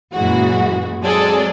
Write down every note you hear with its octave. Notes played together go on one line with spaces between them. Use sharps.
F#2 A#2 E3 G#3 F#4
F#3 G#3 C4 G#4 A4 D5